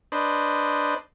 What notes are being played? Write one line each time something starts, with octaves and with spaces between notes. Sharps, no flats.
D4 B4 C5 D#5